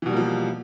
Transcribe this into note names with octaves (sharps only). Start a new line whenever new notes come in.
B2 E3 F3 G3 A#3